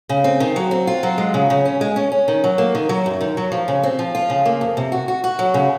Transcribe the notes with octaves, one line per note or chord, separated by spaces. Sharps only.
C#3
C4
D#3
F#3
C4
F4
F#3
G#3
C#3
C#3
C#4
G#3
C#4
C#4
D#3
F#3
A#3
D#3
F#3
F#2
D#3
F#3
F3
C#3
C4
F3
F4
C#3
A#3
F2
C3
F#4
F#4
F#4
F#3
C#3